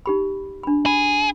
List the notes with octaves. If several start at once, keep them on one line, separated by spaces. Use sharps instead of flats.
D#4 G4 B5
D4 B5
G#4 B5